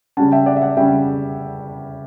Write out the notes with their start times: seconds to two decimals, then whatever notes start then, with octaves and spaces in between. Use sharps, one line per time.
0.17 C#3 G3 C#4 F#5 A5
0.32 E5 G5
0.46 D5 F#5
0.57 E5
0.62 D5 F#5
0.77 C#3 G3 C#4 E5 G5